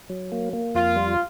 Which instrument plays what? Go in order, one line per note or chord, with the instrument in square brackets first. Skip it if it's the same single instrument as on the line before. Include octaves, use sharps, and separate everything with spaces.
[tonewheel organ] F#3
A#3
A#3
[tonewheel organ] F2 [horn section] F4
[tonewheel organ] G3